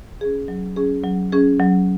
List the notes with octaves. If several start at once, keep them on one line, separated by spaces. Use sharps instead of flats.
C#4 G#4
F#3
C#4 G#4
F#3
C#4 G#4
F#3